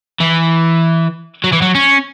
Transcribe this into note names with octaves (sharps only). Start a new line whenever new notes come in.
E3
F#3
E3
F#3
C#4